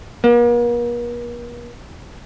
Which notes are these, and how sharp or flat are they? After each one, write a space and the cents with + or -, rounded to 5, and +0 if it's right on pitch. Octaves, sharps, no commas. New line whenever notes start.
A#3 +45